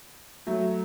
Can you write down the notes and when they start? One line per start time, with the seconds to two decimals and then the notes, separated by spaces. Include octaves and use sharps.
0.47 F#3 A3